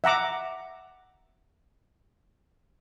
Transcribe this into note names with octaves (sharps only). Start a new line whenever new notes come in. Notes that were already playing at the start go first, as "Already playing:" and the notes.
E5 F#5 A#5 D6